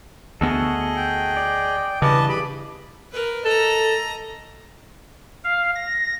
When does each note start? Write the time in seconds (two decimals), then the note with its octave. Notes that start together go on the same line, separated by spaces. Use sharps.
0.41 D2 B3 F#4 G#4 A4 D#5
0.96 G5
1.37 D5
2.02 G2 C#3 E3 B4 D#5 A5 D6
2.29 G4 G#4 B5
3.12 A#4 B4
3.45 A4 D#5 A#5
5.44 F5
5.76 A#6